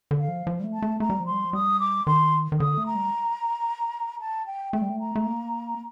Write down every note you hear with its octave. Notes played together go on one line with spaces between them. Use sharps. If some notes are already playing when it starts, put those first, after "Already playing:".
D3
F5
F3
F3
G3
A3
A5
A3
A3 A#5
G3
F3
C6
G3
F3
G3 D#6
D6
D#3 C6
D#3
D3 D#6
A3
A#5
G3
A5
G5
A3 G5
G3
A3
A#5
A3
A#3